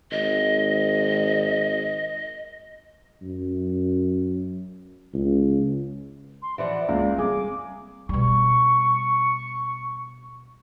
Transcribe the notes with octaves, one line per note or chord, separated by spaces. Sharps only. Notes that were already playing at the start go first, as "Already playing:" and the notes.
G#1 D#5
F#2
C#2
C6
E3 F3 D5 F#5
C#2 A#3
G#3
G3 C4 G#4 G#5 D6
B2 G3 C#6